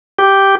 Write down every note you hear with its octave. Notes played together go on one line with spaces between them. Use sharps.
G4